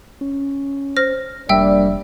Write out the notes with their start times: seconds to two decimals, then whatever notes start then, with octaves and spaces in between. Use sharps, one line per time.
0.21 C#4
0.97 C5 F6 A#6
1.49 F1 G3 A#3 D4 D5 E5 G5 E6